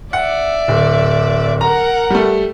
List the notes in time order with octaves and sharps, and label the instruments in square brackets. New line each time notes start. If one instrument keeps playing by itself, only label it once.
[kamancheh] D5 E5 [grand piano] F#5
[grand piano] D1
[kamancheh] A#4 F#5 [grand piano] A#5
[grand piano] G3 A3